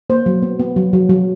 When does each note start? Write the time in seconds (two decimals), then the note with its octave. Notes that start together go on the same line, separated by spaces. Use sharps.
0.10 A#3 C5
0.26 F#3
0.43 B3
0.59 B3
0.76 F#3
0.93 F#3
1.09 F#3